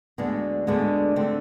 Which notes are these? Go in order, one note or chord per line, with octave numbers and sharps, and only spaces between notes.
D2 D3 G#3 B3 D4
D2 D3 G#3 B3 D4
D3 A3 C4